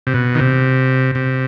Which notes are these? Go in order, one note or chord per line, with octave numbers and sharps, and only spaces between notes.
C3
B2
D#3
C3
C3